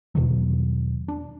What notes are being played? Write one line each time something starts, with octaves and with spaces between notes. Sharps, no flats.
E2 B2 D#3 F#3
D4